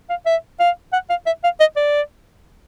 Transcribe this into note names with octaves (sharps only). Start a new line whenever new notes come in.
F5
E5
F5
F#5
F5
E5
F5
D#5
D5